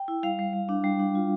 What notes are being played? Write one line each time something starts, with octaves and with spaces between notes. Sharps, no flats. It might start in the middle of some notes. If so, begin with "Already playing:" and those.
Already playing: G5
E4
G3 F5
G3
G3
D4
G3
D4
F4